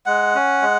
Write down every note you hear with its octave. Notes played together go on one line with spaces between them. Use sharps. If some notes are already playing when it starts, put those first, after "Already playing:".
G#3 F#5
C#4
G#3